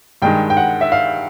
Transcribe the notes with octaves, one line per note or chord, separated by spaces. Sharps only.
G2 D#3 G#3 G5
G5
F#5
E5
F5